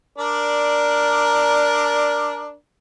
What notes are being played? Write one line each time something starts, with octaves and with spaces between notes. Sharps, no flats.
D4 A#4 D5